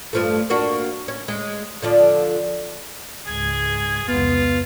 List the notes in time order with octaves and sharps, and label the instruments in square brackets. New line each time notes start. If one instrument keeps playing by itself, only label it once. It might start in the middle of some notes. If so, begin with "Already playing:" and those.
[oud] G2 F3 A3
A#3 D4 F#4
C#4
G#3
D3 F3 D5
[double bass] C#2 G#2 [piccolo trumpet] G#4 [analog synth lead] G#6
[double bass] F1 C#2 [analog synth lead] B3 [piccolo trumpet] F4